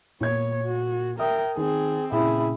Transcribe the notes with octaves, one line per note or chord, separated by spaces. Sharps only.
A#2 B3 C#5 G#6
F#4
A#4 E5 G5 D#6
D#3 C4 G#4
A#2 C#3 E4 G#4